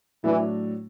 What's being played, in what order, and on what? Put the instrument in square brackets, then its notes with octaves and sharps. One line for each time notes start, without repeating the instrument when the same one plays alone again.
[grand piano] A2 F#3 A3 D4 [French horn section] E3